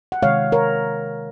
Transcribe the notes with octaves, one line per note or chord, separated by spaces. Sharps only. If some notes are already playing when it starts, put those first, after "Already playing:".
F#5
C3 D#3 G#3 C#5 F5
A#4 C#5